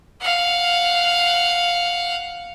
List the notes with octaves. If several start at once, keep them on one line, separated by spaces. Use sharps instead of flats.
F5 F#5